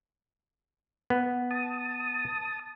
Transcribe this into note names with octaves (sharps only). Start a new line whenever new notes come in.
B3
A5 D#6